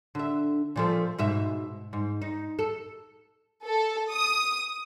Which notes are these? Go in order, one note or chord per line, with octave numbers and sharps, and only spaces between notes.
D3 E5
A#2 F3 A3
G#2 B2 E5
G#2
D#4
A4
A4
D#6